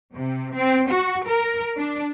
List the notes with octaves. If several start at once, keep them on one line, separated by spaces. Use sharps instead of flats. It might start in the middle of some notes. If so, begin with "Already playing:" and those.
C3
C4
F#4
A#4
D4